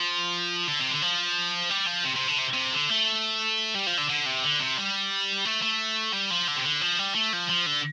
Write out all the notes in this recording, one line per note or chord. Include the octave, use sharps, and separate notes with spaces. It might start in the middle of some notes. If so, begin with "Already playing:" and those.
Already playing: F3
D3
C3
D3
F3
G3
F3
C3
C3
D3
C3
C3
D3
A3
G3
F3
D3
D3
C3
D3
C3
G3
A3
A3
G3
F3
D3
C3
D3
F3
G3
A3
F3
F3
D3